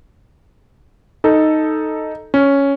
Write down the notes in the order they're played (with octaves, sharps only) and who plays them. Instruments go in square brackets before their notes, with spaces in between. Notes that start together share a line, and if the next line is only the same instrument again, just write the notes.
[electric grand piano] D#4 A4
C#4